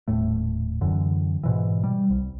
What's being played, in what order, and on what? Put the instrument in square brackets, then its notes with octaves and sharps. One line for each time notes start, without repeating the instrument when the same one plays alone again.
[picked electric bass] D#1 A2 A3
F#2 D3 E3
G#2 B2 E3
G3
C2